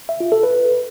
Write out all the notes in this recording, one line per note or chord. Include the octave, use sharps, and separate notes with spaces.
E5
F4
A4
B4